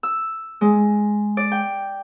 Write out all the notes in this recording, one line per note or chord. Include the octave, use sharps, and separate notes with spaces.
E6
G#3
D5
G5